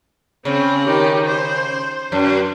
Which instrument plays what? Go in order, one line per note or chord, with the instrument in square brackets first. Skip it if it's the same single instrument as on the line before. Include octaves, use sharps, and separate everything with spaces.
[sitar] C#3 [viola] C4
[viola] D#3 G4
C5
[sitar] F#2